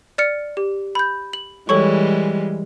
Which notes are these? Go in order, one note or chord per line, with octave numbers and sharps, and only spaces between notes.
D5 F6 C#7
G4
B5 G6
F#7
E3 G3 G#3 A4 C#5 C#6